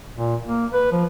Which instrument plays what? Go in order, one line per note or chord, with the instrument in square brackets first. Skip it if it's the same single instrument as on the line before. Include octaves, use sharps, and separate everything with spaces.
[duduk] A#2
A#3
B4
F3